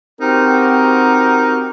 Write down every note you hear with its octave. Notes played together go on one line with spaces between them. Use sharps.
C4 D#4 F#4 G4 A#4